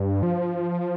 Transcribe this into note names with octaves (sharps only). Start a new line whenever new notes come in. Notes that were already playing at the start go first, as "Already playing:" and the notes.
Already playing: G2
F3